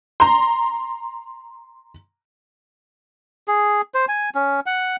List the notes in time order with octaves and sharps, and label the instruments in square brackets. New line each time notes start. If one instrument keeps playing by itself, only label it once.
[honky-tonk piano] A#5 C6
[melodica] G#4
C5
G#5
C#4
F#5